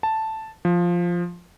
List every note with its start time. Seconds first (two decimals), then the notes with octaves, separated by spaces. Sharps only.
0.03 A5
0.65 F3